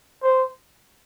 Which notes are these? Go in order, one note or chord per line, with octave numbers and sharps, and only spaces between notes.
C5